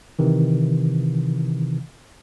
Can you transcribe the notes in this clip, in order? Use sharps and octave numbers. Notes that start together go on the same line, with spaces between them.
C3 D#3 E3